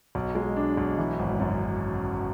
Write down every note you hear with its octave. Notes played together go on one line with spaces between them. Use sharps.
B1
G#3
D4
B1
E3
G#1
F#2